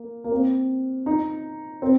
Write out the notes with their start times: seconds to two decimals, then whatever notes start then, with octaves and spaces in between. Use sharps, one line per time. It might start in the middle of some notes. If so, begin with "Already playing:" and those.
Already playing: A#3
0.24 A#3
0.32 C4
1.06 D#4
1.82 C4